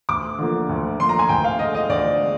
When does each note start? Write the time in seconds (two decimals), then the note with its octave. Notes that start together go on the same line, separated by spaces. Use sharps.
0.09 D2 D6
0.38 D3 F3 A#3
0.69 D2
0.99 D3 F3 A#3 C6
1.09 A#5
1.19 G#5
1.29 D2 G5
1.44 F5
1.59 D3 G#3 D#5
1.75 D#5
1.89 D2 D5
2.19 G#3